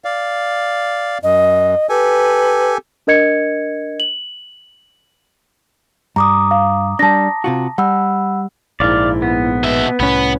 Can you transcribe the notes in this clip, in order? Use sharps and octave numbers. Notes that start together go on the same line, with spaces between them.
D5 F5
F#2 D#5
G4 A4 B4 G#5
D4 A#4 D#5 G#6 C#7
F#7
G2 A#5 D6 D#6
F5
G3 D4 A5 A#6
C3 F4 F#4
G3 F#5 B5 E6
A#1 G#2 E4 D5 F5
B3
B2 B4 E5
C2 A2 B3 C#4